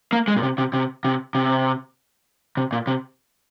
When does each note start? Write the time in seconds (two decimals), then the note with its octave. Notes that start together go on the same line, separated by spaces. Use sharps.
0.13 A#3
0.28 G#3
0.37 A#2
0.43 C3
0.58 C3
0.73 C3
1.05 C3
1.35 C3
2.57 C3
2.72 A#2
2.87 C3